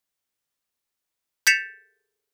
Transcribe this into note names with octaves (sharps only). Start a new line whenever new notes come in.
G6 A6 B6 C#7 E7 F7